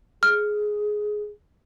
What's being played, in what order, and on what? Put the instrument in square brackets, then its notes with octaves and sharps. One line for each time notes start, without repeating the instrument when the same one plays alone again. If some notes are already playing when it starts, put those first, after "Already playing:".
[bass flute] G#4 [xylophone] F6